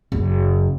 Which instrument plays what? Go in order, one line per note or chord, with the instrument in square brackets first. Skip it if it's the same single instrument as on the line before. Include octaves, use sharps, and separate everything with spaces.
[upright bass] F#1